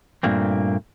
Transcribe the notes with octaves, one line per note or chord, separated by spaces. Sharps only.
G2 A#2 A3 A#3 C4